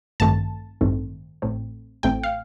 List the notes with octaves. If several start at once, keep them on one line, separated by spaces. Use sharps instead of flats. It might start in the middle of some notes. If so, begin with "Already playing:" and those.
A1 G2 D#3 A3 C4 A5
A1 G2 D#3 A3 C4
A1 A2 A3 C4
A1 A2 A3 C4 G5
F5